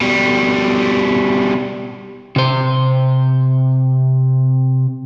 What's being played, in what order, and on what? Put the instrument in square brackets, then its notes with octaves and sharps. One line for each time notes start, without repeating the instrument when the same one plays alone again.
[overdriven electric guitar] B2 G3
[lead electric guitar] C3 C5